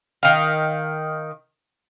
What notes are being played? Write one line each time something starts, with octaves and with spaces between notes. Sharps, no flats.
D#3 F5